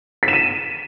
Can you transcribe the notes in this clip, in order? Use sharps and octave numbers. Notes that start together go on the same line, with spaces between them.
B6
E7
D#7